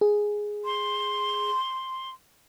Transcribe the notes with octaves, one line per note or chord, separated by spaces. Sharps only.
G#4
C6